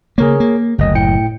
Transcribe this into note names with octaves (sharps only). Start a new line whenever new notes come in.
C#3 A#3 G#4 A#4 C#5
A#3
F#1 D2 D#5
A2 G5 C#7